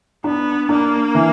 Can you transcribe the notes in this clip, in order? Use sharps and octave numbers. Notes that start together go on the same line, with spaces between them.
B3 D4
A#3 D4
E3